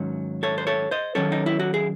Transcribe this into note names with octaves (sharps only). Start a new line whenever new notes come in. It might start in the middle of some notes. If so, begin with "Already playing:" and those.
Already playing: G#2 D#3 F#3 C#4
A4 C#5
C5
A4 C#5
C5 D#5
D#3 F#3 C#4 A4 C#5
D#4
E4
F#4
G#4